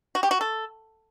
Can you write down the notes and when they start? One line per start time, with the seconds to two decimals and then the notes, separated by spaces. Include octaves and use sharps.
0.15 F#4
0.23 G4
0.31 F#4
0.41 A4